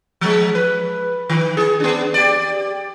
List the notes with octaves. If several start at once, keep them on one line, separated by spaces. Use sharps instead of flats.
F3 G#3
B4
D#3
G#4
B3 D4
G4 D5